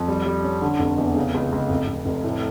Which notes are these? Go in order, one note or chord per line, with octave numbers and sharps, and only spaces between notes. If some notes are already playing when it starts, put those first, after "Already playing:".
Already playing: F2
G3
G3
C#4
D3
F1
E2
C#3
C#2
C#2
F1
F1
F1
A2